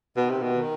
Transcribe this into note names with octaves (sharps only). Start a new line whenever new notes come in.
B2 D#3
C3
B2
D#3